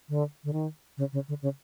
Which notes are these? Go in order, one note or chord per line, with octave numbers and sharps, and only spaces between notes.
D3
D3
D#3
C#3
C#3
D3
C#3